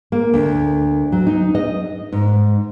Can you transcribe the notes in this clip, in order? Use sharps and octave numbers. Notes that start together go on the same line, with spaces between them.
A#3
D2
F#3
D#4
D#5
G#2